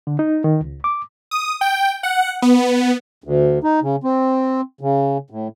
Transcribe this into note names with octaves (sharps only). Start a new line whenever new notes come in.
D3
D#4
D#3
C#2
D6
D#6
G5
F#5
B3
D2
D#4
C#3
C4
C#3
A2